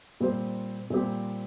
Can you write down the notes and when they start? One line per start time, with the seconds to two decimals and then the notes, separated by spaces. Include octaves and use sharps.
0.20 A#2 G3 C4 G4 C5
0.90 A#2 G3 C4 G4 C5